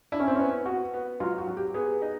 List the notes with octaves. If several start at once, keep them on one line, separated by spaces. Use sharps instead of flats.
D4 E4
C#4
C4
B3 C#4
B3 F#4
B3
F#3 F4
F#4
F#3
G4
B3 G#4
D#4